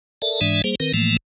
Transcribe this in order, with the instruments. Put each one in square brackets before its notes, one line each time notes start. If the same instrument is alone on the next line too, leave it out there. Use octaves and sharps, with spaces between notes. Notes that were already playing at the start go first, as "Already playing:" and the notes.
[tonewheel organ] A4 A#4 D5 E5 A5
G#2 E3 G#3 D4 D5 E5
G3 A#3 G#4 C5
D#3 C4 A#4 B4
A2 E3 F3 A3 A#3